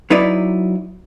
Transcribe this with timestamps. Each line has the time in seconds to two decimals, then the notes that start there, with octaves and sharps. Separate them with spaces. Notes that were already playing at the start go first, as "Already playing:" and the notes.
0.10 F#3 D#4 E4 B4 D5